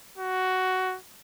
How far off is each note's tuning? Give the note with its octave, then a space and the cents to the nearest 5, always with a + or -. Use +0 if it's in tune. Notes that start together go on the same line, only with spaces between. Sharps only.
F#4 +10